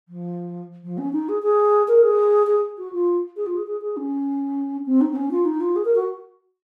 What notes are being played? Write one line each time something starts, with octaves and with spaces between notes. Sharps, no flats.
F3
F3
C#4
D#4
G#4
G#4
A#4
G#4
G#4
F#4
F4
G#4
F4
G#4
G#4
G#4
C#4
C4
D#4
C4
C#4
F4
D#4
F4
G#4
A#4
F#4